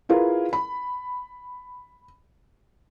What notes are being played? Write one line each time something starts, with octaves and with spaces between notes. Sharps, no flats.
E4 F4 G#4 A#4 B4 F5
B5